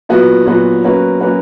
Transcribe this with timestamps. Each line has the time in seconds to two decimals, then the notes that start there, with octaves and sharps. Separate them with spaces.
0.09 A#2 F#3 B3 F#4
0.46 A#2 F#3 B3 F#4
0.84 F#3 A#3 C#4 F#4 B4
1.20 F#3 A#3 C#4 F#4 B4